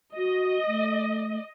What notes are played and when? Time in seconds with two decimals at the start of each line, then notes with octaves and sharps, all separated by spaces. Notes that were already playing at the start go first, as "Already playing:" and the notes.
0.17 F#4 D#5
0.68 A3